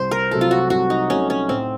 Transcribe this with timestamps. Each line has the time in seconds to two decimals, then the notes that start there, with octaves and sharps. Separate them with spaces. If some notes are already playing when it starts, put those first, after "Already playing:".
Already playing: C2 C5
0.11 A#4
0.31 C3 F#3 A3 A4
0.41 F4
0.51 F#4
0.70 C2 F#4
0.90 D#4
1.10 C3 F#3 A3 C#4
1.30 C#4
1.49 A2 C4